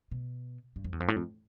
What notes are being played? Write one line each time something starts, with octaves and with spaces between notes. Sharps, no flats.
B2
G2
F2
E2
F2
A2
F2